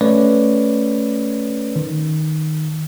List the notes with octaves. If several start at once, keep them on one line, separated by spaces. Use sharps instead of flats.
A3 C#4 B4 C#5 D5
D#3